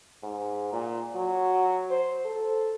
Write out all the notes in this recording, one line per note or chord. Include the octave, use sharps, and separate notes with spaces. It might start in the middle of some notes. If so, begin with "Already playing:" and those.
G#2
A#2
F#3
C5
A4